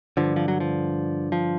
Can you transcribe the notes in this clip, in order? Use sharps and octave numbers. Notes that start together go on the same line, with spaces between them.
G2 D3 F3
F3
F#3
F3
F3